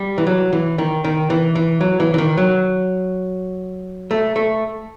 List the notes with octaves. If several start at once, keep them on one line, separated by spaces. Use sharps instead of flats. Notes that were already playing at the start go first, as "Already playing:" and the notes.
Already playing: G3
E3
F#3
E3
D#3
D#3
E3
E3
F#3
E3
E3
D#3
F#3
A3
A3